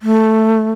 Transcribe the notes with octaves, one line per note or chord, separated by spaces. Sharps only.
A3